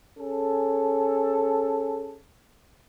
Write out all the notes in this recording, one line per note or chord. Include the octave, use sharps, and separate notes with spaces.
C#4 G#4 A4